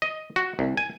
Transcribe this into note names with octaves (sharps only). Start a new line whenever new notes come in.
D#5
F#4
C2
G#5